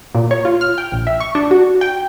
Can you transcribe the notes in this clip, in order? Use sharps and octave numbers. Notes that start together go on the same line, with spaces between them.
A#2
C#5
F4
F6
G5
A#1
E5
C#6
D4
F#4
G5